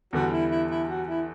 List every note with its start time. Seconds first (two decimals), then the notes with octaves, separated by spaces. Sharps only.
0.13 E2 D3 G3 F#4
0.32 E4
0.50 E4
0.70 E4
0.89 F#4
1.08 E4